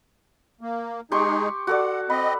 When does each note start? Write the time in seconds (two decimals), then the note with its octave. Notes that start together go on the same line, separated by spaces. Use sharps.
0.61 A#3
1.12 G#3 D#4 G4 G#4 C6 C#6
1.67 F#4 A4 D5 F#5
2.10 C4 D#5 B5